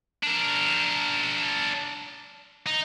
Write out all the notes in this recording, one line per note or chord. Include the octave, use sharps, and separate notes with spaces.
D4 A#4
D#4